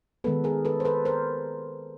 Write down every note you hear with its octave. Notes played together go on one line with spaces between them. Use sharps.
D#3 G#3 B3 A4 B4
G#4 A#4
A4 B4
C5
A4 B4
A#4 C5